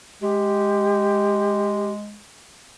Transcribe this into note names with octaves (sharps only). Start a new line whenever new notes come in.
G#3 G4